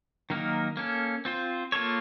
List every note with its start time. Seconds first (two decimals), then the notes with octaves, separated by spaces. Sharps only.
0.30 D#3 F#3 A#3 D#4 A#4
0.77 A#3 C#4 A4
1.25 C4 F4 C5
1.72 A#3 F4 A4 C#5